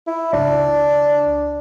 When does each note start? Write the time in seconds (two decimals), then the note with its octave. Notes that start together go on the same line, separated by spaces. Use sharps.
0.07 E4
0.33 C#2 D4